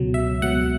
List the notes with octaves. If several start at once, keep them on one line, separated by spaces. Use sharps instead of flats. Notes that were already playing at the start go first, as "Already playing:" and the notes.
Already playing: C#2 B2 F#3
E5
C#2 B2 F#3 F#5